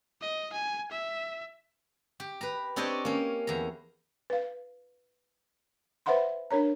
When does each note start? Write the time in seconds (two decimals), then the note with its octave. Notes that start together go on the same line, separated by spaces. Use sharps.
0.21 D#5
0.52 G#5
0.91 E5
2.20 G4
2.41 B4 A#5
2.76 C4 D4 G4 C#5 D#5 G5
3.05 A#3 C#4
3.47 E2 A#5
4.30 B4 F5
6.06 B4 C5 E5 F#5 B5 C6
6.51 D4 A#4 C#5 A#5